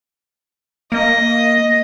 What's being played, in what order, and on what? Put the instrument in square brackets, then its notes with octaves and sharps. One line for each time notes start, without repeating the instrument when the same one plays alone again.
[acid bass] A#3 [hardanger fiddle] D#5